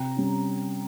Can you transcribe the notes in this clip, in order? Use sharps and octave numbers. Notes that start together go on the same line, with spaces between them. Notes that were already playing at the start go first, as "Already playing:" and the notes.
Already playing: C3 G5 A#5
G3 C#4